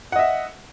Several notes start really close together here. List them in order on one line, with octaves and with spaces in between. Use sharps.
F#5 D#5 E5